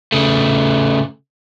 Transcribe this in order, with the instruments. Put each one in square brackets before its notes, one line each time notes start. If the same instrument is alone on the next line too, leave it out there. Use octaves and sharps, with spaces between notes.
[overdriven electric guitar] C#3 A3